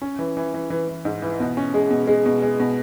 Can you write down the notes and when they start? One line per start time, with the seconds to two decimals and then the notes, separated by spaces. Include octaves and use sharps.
0.02 C#4
0.19 E3
0.37 E3
0.54 E3
0.70 E3
0.89 E3
1.05 G#2
1.22 E3
1.40 B2
1.57 C#4
1.74 G#3
1.91 B2
2.07 G#3
2.26 B2
2.42 G#3
2.60 B2